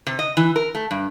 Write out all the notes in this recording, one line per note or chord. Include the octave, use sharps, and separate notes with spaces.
C3
D#5
E3
A#4
A3
G2